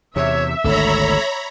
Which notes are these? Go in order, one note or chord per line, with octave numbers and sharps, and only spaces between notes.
E2 C3 C#5 E5
G#1 D2 A4 C#5 A#5 B5